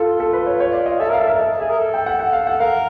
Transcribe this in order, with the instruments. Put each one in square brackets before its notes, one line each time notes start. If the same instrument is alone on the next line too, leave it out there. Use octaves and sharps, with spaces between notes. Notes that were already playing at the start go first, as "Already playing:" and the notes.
Already playing: [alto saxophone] F4 [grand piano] A4
[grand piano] A4
B4
C#5
C#5
D5
D#5
[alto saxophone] A4 [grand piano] E5
[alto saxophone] A#4 [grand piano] F5
[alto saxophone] A4
[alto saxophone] A#4 [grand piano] E5
[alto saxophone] A4 [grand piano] D#5
[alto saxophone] G#4 [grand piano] E5
[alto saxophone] A#4
A4
[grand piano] G5
F#5
F#5
F5
F#5
[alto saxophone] A#4 [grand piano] F5